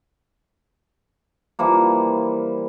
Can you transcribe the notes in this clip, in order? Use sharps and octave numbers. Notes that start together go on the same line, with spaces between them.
E3 F3 G3 A#3